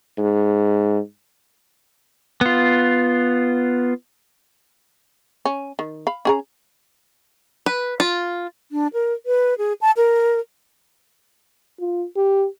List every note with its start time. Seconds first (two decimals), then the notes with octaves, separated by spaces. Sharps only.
0.18 G#2
2.41 B3 F4
5.45 C#4
5.79 D#3
6.07 F5 B5
6.25 C#4 G#4 A#5
7.66 B4
8.00 F4
8.72 D4
8.93 A#4
9.26 B4
9.58 G#4
9.81 A5
9.97 A#4
11.80 F4
12.17 G4